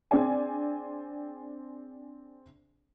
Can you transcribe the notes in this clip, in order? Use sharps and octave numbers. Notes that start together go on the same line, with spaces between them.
C4 D4 G#4 D5 G#5